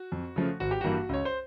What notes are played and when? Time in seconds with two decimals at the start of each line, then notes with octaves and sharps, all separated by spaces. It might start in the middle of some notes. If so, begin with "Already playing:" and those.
Already playing: F#4
0.12 F2
0.36 C#3 F3 A3
0.60 G#1 F#4
0.71 G4
0.81 G2 E3 G3 A#3 F#4
1.09 C#2 C#5
1.25 C5